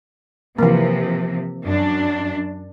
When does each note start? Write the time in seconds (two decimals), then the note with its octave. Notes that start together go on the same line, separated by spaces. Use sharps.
0.59 C3 E3 F3 A#3
1.64 F#2 D4